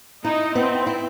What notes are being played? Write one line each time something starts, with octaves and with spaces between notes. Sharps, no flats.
D#4 E4
B3 C4
E4